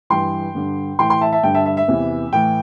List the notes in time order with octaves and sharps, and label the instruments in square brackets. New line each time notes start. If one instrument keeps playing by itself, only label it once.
[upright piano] G2 E3 G5 C6
G2 D3
A2 E3 G5 C6
G5 C6
E5 A5
E5 A5
G2 D3 G5
E5 A5
E5
E5
E2 C3 E3
A2 E3 G5